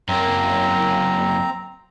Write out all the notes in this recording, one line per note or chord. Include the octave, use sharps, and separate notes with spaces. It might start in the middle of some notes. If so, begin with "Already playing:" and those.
F#2 A#3 C4 A#5